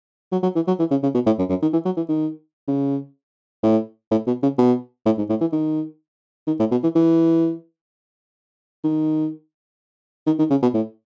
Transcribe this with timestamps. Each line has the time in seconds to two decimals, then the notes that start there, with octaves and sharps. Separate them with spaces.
0.32 F#3
0.43 F#3
0.55 E3
0.67 F#3
0.79 E3
0.91 C#3
1.03 C#3
1.14 B2
1.26 A2
1.39 F#2
1.49 F#2
1.62 D#3
1.73 E3
1.85 F#3
1.97 E3
2.09 D#3
2.68 C#3
3.63 A2
4.11 A2
4.27 B2
4.43 C#3
4.58 B2
5.06 A2
5.18 G#2
5.29 A2
5.41 E3
5.52 D#3
6.47 D#3
6.59 A2
6.71 B2
6.83 E3
6.95 E3
8.84 D#3
10.27 D#3
10.39 D#3
10.50 C#3
10.62 B2
10.74 A2